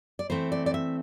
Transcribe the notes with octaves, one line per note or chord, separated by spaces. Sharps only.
D5
E3 A3 C4 C5
D5
D5
E5